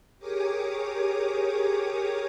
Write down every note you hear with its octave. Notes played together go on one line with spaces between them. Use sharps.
G4 G#4 A#4 C#5 D6 D#6